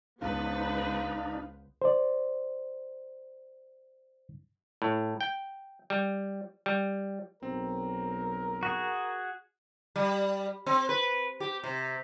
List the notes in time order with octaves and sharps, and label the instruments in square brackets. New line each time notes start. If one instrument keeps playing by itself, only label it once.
[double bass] C#2 [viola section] B3 B4 C5 [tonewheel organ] D4 D#4 [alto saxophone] F5
[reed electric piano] C5 D5
[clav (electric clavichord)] A2
G5
G3
G3
[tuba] B1 [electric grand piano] C4 [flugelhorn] A#4
[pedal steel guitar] F#4 G#4
[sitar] G3
C4
B4
G4
C3